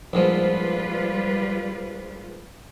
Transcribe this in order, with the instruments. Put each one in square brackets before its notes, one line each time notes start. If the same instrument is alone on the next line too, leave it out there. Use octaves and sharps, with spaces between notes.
[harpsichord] A#1 G#2 F3 [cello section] G3 F4 B4